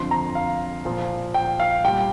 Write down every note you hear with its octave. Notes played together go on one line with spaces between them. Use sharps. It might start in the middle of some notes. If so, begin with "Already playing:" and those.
Already playing: F2 D3 F3 C6
A#5
F5
A#2 F3
G5
F5
A#2 G3 G5